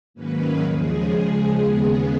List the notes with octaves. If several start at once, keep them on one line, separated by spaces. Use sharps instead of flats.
G#2 D#3 F#3 A#3 C#4 B4
D#2 C#3 F3 G#3 G#4
C#3 F3 G#3
D#2 C#3 G#3 B3 G#4